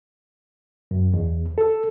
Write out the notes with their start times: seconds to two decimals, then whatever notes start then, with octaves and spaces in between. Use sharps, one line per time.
0.91 F#2
1.14 E2
1.58 A4